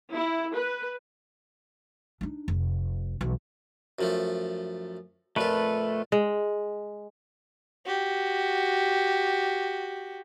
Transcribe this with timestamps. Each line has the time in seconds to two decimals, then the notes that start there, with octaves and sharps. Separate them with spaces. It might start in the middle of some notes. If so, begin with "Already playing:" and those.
0.12 E4
0.54 B4
2.21 D4 D#4
2.48 F1
3.21 B1 E3
3.99 F#2 F3 A3
5.36 F2 A#2 A3 F4 B4
6.12 G#3
7.86 F#4 G4